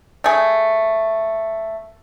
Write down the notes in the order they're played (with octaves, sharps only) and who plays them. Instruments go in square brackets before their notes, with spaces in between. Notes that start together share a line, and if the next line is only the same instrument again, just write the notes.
[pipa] A3 G#4